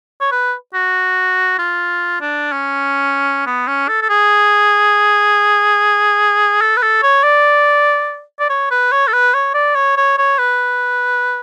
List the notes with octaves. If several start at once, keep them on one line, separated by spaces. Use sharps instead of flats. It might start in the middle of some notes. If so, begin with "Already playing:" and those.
C#5
B4
F#4
F4
D4
C#4
B3
C#4
A4
A4
G#4
A4
B4
A4
C#5
D5
D5
C#5
B4
C#5
A4
B4
C#5
D5
C#5
C#5
C#5
B4